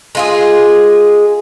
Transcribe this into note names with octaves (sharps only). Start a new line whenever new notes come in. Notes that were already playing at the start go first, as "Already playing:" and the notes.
G#3 F4 G#4